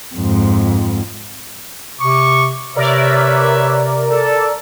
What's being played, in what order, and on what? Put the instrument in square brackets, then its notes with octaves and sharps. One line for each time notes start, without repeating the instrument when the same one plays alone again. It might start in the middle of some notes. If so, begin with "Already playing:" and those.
[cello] F2 G#2
[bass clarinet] C3 [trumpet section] C#6 D6
[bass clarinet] C3 [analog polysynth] A#4 D5 [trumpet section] B4 C#5 E5
[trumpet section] A4